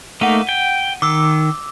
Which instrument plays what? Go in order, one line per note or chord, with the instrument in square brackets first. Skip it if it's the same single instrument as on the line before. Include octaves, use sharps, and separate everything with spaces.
[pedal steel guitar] A3 A#3 D#4 [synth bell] F#5 D#7
[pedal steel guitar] G5
[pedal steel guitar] D#3 [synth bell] D6 E6